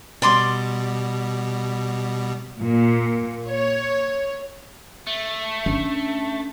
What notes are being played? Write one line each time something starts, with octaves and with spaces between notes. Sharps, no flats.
B2 G3 D5 C6 D6
A#2
C#5
A3
C#4 D4